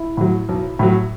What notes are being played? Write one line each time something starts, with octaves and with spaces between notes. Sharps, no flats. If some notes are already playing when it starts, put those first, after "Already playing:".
Already playing: E4
A2 F#3
B1
A2 F#3